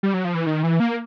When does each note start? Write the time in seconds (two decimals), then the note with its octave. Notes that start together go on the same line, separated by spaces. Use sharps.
0.03 G3
0.14 F#3
0.25 F3
0.35 E3
0.46 D#3
0.63 E3
0.80 A#3